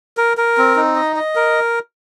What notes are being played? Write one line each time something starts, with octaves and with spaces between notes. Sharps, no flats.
A#4
A#4
C4
D#4
D#5
D#5
A#4